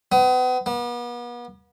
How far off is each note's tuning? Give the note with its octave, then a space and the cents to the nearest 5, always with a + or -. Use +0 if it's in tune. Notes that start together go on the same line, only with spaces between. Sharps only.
B3 +35
B3 -40